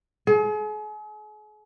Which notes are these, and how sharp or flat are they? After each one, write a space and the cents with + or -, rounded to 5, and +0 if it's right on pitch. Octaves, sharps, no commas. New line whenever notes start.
G#4 +40